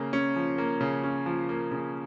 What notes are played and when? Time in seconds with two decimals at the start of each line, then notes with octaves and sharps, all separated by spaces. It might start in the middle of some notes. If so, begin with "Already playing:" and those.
Already playing: C#3 A#3
0.13 C#4
0.36 F3
0.58 A#3
0.81 C#3
1.03 C#4
1.26 F3
1.49 A#3
1.72 C#3